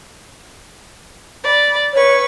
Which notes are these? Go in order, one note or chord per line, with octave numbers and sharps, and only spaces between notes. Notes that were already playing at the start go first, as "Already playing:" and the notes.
D5 B5
B4 C#5 C#6